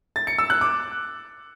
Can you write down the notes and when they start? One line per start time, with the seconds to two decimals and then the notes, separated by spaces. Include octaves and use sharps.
0.16 A6
0.27 C#7
0.38 E6
0.50 F#6
0.61 D6